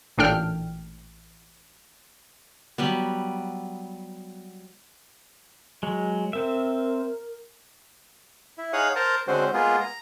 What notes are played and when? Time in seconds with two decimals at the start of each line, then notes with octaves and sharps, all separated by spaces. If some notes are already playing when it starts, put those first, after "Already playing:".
0.18 A1 A#2 D4 A4 G5 F6
2.78 F#3 G3 B3
5.83 F#3 G#3
6.33 C4 A#4 E5
8.58 E4
8.73 D#4 G#4 C#5 F5 F#5 D#6
8.96 A#4 C5 A5 A#5
9.27 D3 G#3 C4 C#4 F#4 C5
9.54 G#3 A#3 B3 F4 G#4
9.80 A#5